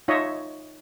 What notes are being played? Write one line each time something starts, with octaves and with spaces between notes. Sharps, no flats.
D#4 F4 C#5 D#5 E5